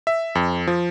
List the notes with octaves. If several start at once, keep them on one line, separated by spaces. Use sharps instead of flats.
E5
F2
F3